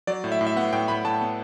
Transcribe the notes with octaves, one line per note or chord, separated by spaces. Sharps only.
F#3 D5
A2
E5
A2
E5
B3 F#5
A2 G5
A2 B5
A2 A5
B3